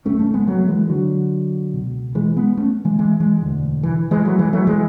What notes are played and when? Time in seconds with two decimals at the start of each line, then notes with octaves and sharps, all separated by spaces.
0.05 G#1 F#2 C#3 A3 C#4
0.19 A3 C#4
0.34 G#3 B3
0.47 F#3 A3
0.59 A3
0.68 E3 G#3
0.89 D3 F#3
1.73 C#2 B2
2.15 E3 G#3
2.37 G#3 B3
2.57 A3 C#4
2.85 E3 G#3
2.99 E3 G#3
3.20 E3 G#3
3.41 E1 D2 D3
3.83 E3
4.11 E3 G#3
4.25 F#3 A3
4.39 E3 G#3
4.53 F#3 A3
4.67 E3 G#3